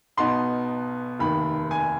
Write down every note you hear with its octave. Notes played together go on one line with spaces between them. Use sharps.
B1 B2 B3 D#4 C6
F1 D#2 D#3 B5
G#5